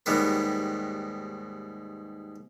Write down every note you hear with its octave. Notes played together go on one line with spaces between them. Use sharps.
D#2 G#2 D#3 G3 B3 B4